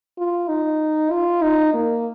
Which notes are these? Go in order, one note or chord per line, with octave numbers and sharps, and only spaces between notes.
F4
D#4
F4
D#4
A#3